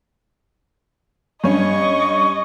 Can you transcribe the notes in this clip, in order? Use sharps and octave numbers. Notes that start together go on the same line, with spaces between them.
G2 C#4 D#5 C#6